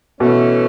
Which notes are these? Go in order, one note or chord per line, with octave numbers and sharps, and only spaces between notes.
B2 E3 A3 C#4